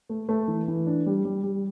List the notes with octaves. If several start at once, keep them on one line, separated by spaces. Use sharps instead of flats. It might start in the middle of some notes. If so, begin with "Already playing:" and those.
A3
A3
E3
E3
D4
G3
G3
G3